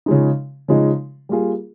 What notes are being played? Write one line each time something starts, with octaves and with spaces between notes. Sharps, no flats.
C#3 F3 G#3 D#4
C#3 F3 G#3 D#4
G3 A#3 F4 G#4